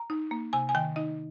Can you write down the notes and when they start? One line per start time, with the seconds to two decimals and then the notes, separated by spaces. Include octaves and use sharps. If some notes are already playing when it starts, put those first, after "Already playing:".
Already playing: A#5
0.10 D#4
0.31 A#3
0.53 C3 G#5
0.69 G#5
0.75 D#3 G5
0.96 D#4 D#5